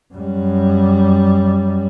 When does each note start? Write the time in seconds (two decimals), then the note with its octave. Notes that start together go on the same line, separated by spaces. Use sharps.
0.14 F#2 G3